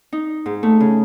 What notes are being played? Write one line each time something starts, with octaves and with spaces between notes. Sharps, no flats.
D#4
G#2
A3
C#3